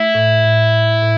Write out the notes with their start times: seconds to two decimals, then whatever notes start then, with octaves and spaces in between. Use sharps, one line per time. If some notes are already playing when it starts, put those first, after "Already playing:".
Already playing: A3 E4
0.15 A2
0.44 A2
0.73 A2
1.02 A2